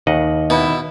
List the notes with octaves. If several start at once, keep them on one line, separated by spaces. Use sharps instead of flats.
D#2 D#3 D#5 F#5
B2 E4